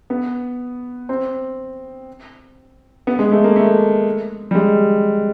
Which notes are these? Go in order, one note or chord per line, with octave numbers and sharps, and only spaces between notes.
B3
C4
B3
G#3
A3
A#3
A3
G3
G#3